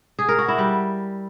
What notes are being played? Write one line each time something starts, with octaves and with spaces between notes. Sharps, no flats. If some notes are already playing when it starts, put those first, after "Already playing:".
G#4
A#4
F#4
E4
G3